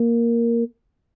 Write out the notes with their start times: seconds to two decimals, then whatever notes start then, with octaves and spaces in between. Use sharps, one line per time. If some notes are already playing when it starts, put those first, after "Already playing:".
Already playing: A#3